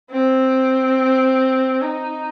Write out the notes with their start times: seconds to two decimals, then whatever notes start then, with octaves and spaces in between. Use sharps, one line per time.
0.11 C4
1.81 D#4